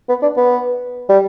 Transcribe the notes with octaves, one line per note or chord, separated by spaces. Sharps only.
B3
D4
B3
G3